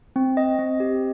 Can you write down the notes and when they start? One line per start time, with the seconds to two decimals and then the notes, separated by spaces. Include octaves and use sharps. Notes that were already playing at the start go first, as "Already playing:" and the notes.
0.16 C4
0.37 D#5
0.59 C4
0.80 G4